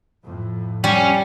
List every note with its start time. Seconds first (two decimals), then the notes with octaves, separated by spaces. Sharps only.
0.24 F2 A2
0.84 G3 C#4